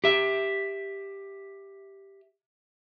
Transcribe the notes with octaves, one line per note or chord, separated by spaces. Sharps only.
G4 E5